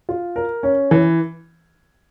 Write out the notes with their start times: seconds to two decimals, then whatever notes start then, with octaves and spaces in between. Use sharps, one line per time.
0.09 F4
0.36 A#4
0.63 C#4
0.91 E3